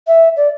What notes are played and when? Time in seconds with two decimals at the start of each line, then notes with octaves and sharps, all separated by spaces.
0.07 E5
0.36 D5